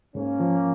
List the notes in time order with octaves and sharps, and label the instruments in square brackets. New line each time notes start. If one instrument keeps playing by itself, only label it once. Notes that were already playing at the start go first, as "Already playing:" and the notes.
[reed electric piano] G#2 [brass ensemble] A#3 C#4
[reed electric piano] F3